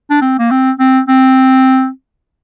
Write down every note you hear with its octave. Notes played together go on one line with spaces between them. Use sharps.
D4
C4
A#3
C4
C4
C4